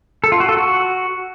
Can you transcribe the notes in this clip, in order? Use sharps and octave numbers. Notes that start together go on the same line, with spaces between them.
A4
F4
F#4
A4
F#4